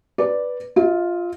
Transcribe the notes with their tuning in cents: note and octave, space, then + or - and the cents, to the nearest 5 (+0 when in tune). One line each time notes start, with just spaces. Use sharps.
B4 +0 D5 +0
F4 +0 E5 -45